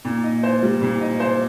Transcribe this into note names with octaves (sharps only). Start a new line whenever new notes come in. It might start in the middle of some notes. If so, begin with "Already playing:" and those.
A#2
D#4
C5
G3
A#2
D#4
C5